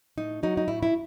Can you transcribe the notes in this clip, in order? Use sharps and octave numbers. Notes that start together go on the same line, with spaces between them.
A2 D#4
F#3 D#4
D#4
A2 E4
E4